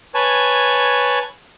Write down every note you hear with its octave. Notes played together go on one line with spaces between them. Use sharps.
B4 C#5 G#5 A5